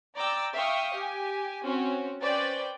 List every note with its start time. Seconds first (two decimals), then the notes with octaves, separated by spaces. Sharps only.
0.16 D5 G5 A#5 D6 E6
0.54 E5 F5 G5 C#6 D#6
0.96 G4 G#5
1.65 C4 C#4 F#4
2.22 C#4 B4 C5 D5 G5 A6